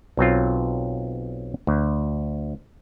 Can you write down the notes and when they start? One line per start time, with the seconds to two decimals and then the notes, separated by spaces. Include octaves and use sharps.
0.17 B1 F#3 C4 F4
1.67 D2